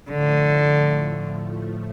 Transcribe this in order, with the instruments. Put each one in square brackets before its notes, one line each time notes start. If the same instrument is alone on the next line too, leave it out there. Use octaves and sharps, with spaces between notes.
[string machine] A2 F3 A3 [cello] D3